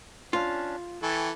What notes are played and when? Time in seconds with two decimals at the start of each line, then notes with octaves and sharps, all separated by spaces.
0.33 C#4 D4 F4
1.03 E3 A4 G5 G#5 C#6